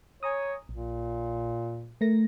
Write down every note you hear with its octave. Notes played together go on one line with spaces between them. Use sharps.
C#5 G#5 A#5 D#6
A#1 A#2
A3 A#4 A#6